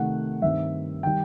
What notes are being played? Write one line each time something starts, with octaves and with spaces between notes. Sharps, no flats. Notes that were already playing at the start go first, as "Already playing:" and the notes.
Already playing: C3 D#3 A3 F#5
G2 D#3 G3 C4 E5
D#3 G3 G5